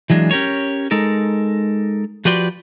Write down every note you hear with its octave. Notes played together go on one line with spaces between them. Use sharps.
E3 F#3 G#3 D4
C#4 G4 A#4 C#5
G#3 D#4 A4 A#4
F3 F#4 G4 B4 D5 C6